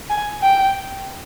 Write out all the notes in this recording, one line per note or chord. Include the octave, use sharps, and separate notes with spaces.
G#5
G5